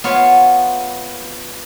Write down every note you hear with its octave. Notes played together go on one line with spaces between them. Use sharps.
B3 F4 C#5